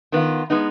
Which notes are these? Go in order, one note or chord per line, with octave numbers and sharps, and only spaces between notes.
D#3 B3 F4
G#3 B3 D#4